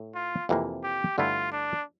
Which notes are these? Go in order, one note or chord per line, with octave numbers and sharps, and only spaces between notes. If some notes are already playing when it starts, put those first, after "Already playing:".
Already playing: A2
F4
F2 C3 E3 A#3 E4
G4
G2 D3 A3 E4 F4
D4